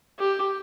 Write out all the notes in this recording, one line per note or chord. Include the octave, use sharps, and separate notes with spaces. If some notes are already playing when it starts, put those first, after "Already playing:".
G4